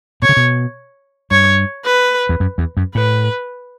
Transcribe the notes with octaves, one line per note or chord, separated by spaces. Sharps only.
B2 C#5
C#3
B2
G2 C#5
B4
E2
F#2
E2
F#2
A2 B4